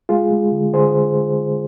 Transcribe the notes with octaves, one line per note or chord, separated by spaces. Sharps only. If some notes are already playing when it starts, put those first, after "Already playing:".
G#3 F4 G#4
G#3
D3
D3 G#4 C5